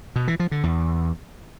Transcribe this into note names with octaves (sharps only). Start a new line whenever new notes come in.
B2
E3
F3
D3
E2